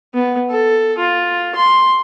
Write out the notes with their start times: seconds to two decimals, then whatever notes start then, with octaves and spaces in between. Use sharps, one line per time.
0.15 B3
0.50 A4
0.99 F4
1.55 C6